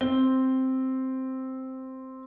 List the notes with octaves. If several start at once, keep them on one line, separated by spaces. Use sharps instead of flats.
C4 G7